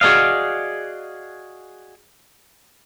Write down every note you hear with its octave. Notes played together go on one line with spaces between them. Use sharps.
F#4 G#4 A4 D5 D#5 F5